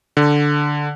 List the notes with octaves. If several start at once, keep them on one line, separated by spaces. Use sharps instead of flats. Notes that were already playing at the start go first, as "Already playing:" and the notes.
D3